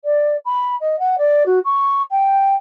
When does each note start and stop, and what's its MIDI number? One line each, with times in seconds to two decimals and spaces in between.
0.04 0.36 74
0.45 0.75 83
0.80 0.98 75
0.99 1.15 78
1.18 1.43 74
1.45 1.59 66
1.64 2.02 85
2.10 2.55 79